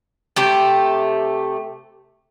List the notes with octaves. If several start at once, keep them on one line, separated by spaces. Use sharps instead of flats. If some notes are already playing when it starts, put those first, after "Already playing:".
C3 A3 G4